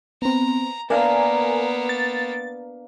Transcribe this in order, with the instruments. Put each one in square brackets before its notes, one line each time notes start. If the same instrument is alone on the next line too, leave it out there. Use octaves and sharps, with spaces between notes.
[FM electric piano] B3 C4 [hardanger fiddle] A#5
[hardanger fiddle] A#3 B3 [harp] D4 F5 A#5 [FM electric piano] A#4 G#5
[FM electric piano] A6